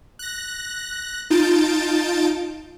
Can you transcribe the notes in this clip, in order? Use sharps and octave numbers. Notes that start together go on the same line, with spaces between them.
F#6 A#6
D#4 F4 A5 G6 A6 D7